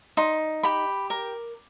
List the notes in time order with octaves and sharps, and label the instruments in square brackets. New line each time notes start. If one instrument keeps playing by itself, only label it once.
[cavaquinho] D#4 C6
G4 B5
A#4